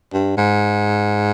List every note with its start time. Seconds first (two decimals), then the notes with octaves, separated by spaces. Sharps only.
0.13 G2
0.37 G#2